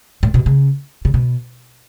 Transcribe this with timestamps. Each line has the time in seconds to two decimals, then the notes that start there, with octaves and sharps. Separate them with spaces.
0.23 A2
0.34 B2
0.46 C#3
1.05 C#3
1.14 B2